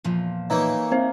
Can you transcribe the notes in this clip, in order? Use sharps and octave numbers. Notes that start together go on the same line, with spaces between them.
E2 A#2 F3
E3 A#3 D#4 C#5 E5
A#3 C4 C5 E5